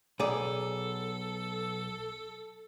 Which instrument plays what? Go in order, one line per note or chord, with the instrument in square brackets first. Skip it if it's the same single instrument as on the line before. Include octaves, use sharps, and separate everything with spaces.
[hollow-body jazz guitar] B1 G#4 D5 [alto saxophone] A4